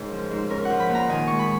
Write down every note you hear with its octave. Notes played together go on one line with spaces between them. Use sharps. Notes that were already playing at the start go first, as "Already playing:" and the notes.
Already playing: G#2 C#3 C#4 G#4 A#4
F3
G#2
C#4 A#4
F3 F#5
B5
A#2
A#5
D#3 G#5
G#3 C#6
B5